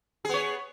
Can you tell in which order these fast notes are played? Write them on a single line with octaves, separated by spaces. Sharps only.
G#4 B3 C#5